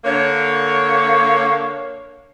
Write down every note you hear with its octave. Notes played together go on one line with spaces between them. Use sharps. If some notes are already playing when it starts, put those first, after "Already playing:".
D3 A#3 C#5